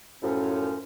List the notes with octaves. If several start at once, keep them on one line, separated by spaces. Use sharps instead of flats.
F#2 A2 F3 C#4